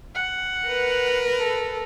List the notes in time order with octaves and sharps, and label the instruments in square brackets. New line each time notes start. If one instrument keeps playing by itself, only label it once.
[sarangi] F#5
[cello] A#4 B4
[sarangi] A4